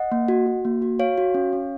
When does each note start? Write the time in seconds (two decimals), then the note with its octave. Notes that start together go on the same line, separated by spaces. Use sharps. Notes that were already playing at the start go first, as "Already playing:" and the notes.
Already playing: D#5 F#5
0.12 A#3
0.28 F#4
0.46 F#4
0.65 A#3
0.82 F#4
0.99 F#4 C#5 F5
1.18 F#4
1.34 C#4
1.53 C#4